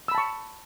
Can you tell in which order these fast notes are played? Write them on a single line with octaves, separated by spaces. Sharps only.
E6 B5 A5 C#6